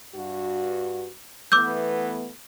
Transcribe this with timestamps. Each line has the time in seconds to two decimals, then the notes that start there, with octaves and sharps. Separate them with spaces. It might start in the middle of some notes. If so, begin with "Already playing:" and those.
0.15 G2 F#4
1.52 E3 A3 B3 D6 E6 G6